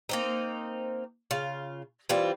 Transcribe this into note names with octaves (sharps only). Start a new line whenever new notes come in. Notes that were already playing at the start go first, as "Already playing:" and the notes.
A#3 C4 D#4
C#3 F4
E3 G3 C4 F4